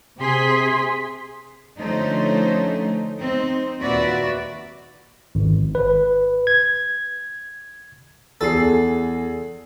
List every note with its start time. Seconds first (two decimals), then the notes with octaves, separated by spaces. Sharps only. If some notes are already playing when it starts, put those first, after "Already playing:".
0.19 C3 G#4 C6 B6
1.78 D3 F3 A3 C#4 D#4 C5
3.19 C4 D#4
3.78 D#2 A#2 F#4 B4 D5 E5
5.35 G#1
5.75 B4
6.47 G#6
8.41 E2 G#4 A4 C7